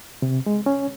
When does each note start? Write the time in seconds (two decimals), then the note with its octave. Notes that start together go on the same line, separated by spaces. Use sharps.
0.22 C3
0.46 G#3
0.66 C#4